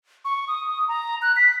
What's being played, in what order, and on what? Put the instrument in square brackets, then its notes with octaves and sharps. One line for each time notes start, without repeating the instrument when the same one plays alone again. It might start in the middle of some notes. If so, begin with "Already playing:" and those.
[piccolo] C#6
D#6
A#5
F#6
B6